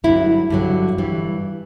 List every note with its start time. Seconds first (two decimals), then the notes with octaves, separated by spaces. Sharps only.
0.04 G2 D3 F#3 E4
0.50 G2 D3 F#3
0.98 G2 E3 G3